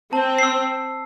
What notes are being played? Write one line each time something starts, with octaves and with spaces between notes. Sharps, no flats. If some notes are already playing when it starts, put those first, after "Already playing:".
C4 A5
E6 C7